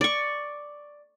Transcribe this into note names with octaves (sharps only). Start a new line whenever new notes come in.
D5 C#6